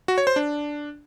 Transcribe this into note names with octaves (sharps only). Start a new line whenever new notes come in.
F#4
C#5
C5
D4